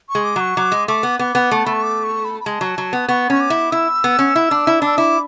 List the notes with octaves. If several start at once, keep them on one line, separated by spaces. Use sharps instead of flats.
C#6
G#3
D6
F#3 C#6
F#3 D6
G#3
A3 D6
B3
B3 D6
B3
A3
A5
A3 B5
C#6
D6
C#6
B5
B5
G#3 A5
F#3
F#3
B3
B3 C#6
C#4 C#6
D6
E4
E4 E6
B3
C#4
E4
D4
E4
D4 E6
E4 D6